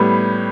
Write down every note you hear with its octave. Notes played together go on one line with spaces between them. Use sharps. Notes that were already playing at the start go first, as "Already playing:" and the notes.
Already playing: A2 G3 B3